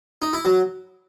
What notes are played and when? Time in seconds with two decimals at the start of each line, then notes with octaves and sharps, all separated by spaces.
0.22 D#4
0.33 E4
0.45 F#3